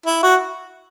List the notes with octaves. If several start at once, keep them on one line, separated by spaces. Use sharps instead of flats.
E4
F#4